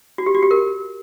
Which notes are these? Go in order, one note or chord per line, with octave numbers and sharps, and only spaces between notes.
F#4
G4
F#4
G4
A#4